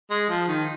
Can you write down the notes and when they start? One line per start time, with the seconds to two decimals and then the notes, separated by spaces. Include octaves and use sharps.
0.11 G#3
0.29 F3
0.48 D#3